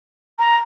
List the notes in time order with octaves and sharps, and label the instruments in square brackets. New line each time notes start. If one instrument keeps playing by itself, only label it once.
[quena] A#5